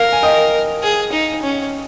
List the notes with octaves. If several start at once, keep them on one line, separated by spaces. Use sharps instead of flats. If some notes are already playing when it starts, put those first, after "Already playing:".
Already playing: A#4 F5
G#5
D#5 G5
G#4
D#4
C#4